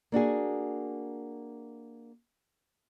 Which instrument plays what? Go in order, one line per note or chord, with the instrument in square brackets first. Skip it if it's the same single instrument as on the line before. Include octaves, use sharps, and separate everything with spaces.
[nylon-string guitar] A#3 D4 F#4 G#4